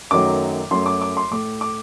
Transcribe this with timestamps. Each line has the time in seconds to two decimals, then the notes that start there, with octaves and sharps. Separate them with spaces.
0.11 F#2 D#3 F#3 A3 D6
0.70 F#2 F#3 A3 C6
0.86 D6
1.02 D6
1.17 C6
1.31 A2 A3 D6
1.61 D6